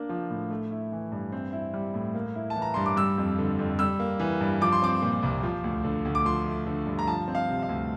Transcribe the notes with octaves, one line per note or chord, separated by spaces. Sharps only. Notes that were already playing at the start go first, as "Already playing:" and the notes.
Already playing: A#3 D4
F3
A2
A3
E4
E3
G2
C4
E4
G3
A2
A#3
E4
A5
E3
A#5
G2 C6
D6
G3 E6
F2
D3
F2
G3 E6
A#3
E3
G2
F3 D6
C6
C4 D6
A#2
C2
F3
D2
D3
D2
D6
F3 C6
A3
D3
G2
A#5
F3 A5
C4
F5
C3
F5
D2